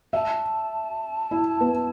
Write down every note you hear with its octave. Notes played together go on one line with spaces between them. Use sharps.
E5 A5
E4
B3